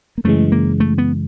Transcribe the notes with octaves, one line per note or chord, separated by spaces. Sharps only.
A#3
F#2 C#3 E3 G#3 A3
A#3
A3
B3